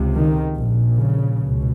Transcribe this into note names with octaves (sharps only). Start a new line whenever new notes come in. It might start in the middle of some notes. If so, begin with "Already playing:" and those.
Already playing: C#2 C3
D#3
A#1 A#2
C#3
C#2 B2